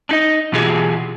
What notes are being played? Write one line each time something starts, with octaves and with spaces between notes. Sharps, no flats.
D4 D#4 D#5
B2 E3 F4 G4 G#4